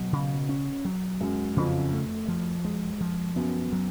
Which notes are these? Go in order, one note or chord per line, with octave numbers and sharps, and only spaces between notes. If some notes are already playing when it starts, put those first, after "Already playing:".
Already playing: B2 F#3
C#3
C#4
F#3
F#2 G#3
F2 C#3
A3
F3
G#3
F3
F#2 B3
F#3